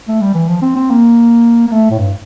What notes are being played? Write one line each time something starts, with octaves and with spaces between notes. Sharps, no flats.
A3
G3
E3
F3
C4
C4
A#3
A#3
A3
A2
G2